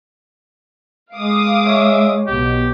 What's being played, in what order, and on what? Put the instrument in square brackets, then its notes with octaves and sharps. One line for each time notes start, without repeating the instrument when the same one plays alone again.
[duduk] G#3 [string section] F5 D6 D#6
[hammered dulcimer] C#5 [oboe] E5
[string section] B1 B2 [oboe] G4